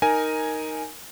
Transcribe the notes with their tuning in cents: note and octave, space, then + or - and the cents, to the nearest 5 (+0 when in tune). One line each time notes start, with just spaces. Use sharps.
D#4 +5 A#4 +0 G#5 +0